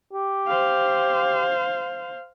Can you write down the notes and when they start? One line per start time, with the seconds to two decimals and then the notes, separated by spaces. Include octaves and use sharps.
0.14 G4
0.47 C5 F5